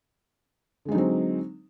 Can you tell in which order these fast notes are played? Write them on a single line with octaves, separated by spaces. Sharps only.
D3 G#3 D#4 F#3 C4